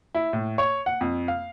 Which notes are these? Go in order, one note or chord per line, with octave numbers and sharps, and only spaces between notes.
E4
A2
C#5
F#5
F2
F5